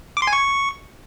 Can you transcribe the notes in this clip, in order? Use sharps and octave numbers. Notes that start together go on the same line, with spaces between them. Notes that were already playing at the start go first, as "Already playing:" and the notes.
D6
C6
G#5
C#6